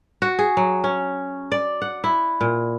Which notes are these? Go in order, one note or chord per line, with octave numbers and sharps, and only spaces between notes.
F#4
G#4
F#3
C#4
D5
F#5
E4
A#2